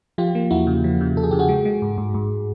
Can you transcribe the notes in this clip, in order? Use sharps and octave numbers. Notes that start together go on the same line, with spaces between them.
F3 F4 G4
A#3
E2 E4 F#4
C#3
F3
C#3
C#3 A4
G#4
C#3 G4
F#4 G#4
G#3
G#3
G#2
G#2
G#2